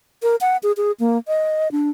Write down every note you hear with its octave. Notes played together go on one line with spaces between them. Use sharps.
A#4
F#5
G#4
G#4
A#3
D#5
D4